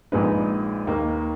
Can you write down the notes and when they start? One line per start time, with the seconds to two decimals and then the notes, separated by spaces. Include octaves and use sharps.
0.12 A#1 A#2 G#3 D#4 B4
0.87 D#2 D#3 A#3